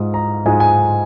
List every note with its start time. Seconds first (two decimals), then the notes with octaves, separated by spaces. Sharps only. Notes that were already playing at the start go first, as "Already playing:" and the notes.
Already playing: G#2 G#3 F4 D#6
0.14 A#5
0.46 G#2 G#3 F4 G#5
0.60 G#5